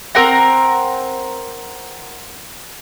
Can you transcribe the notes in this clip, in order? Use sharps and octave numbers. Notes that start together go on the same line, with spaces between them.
C4 A#4 F#5 A#5